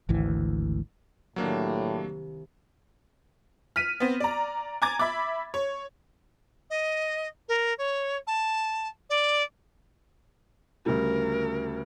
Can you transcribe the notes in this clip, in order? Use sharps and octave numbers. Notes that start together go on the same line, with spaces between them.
G#1 D2 E3
C2 A2 D#3 F#3 A#3 D4
F6 B6 D#7
B3 C4
D5 A#5
G#5 A#5 D6 G#6 A6
E5 B5 D6
C#5
D#5
A#4
C#5
A5
D5
D2 C#3 G3 A#4